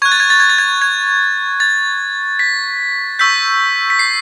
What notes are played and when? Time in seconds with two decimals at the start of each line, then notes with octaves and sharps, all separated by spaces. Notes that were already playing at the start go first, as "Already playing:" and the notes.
0.02 C#6 F#6 G#6
0.12 A6
0.20 G#6
0.30 A6
0.40 G#6
0.50 A6
0.58 G#6
0.82 G#6
1.60 A6
2.39 B6
3.19 C#6 E6 G6 B6
3.90 B6
3.99 C7